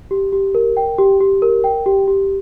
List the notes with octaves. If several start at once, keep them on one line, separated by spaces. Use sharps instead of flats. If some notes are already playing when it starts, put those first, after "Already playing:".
G4
G4
A#4
G5
G4
G4
A#4
G5
G4
G4